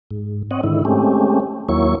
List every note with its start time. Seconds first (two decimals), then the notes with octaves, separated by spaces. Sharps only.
0.11 G#2
0.51 C4 C#5 D#5 F#5
0.64 G#2 D3 D#3 E4
0.85 G#3 A3 C4 C#4 G4
1.69 D#2 F#3 A#3 E4 C#5 C#6